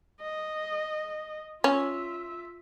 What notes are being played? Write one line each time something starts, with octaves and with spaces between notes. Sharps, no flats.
D#5
C#4 F4 E5